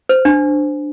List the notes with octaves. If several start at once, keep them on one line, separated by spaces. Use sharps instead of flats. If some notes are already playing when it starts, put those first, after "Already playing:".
C5
D4